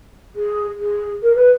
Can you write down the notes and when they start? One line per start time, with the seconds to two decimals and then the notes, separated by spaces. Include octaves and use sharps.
0.35 G#4
0.79 G#4
1.23 A#4
1.36 B4